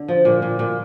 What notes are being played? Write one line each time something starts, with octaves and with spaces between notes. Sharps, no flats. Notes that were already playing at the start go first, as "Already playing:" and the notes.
Already playing: D3
F3
A#2
A#2
A#2